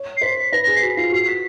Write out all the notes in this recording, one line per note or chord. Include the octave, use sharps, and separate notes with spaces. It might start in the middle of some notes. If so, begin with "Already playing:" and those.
Already playing: C#5
C7
C5 B6
B4 A#6
G#4
C7
F#4 B6
F4 C7
F#4 C7
B6